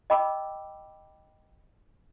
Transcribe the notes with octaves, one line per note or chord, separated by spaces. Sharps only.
D#5 G5 A5 B5 D6 E6